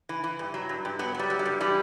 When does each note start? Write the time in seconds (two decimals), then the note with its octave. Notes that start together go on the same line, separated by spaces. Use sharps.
0.09 E3
0.24 E3
0.39 G2
0.54 F#3
0.69 G2
0.85 G2
0.99 F#3 B3
1.14 F#3 G3
1.30 F#3
1.39 G3
1.45 G2
1.60 E3 G3